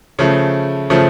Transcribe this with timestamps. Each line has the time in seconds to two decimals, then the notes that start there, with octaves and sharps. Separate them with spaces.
0.19 C#3 F3 A3
0.90 C#3 F3 A3